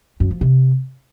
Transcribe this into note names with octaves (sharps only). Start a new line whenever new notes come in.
F#2
F3
C3